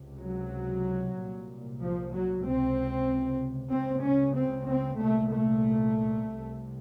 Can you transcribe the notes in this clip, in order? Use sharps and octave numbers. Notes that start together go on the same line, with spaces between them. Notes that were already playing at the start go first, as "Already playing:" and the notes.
Already playing: C#2 C3
F#3
C2 A#2
F3
F#3
C#2 C3 C4
C#2 C#3 C4
C#4
C4
C4
C2 A#2 A3
A3
C2 C3